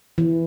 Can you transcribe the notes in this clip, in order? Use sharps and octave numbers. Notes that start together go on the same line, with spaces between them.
E3